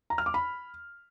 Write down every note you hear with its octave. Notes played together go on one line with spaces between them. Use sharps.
A#5
F6
D6
B5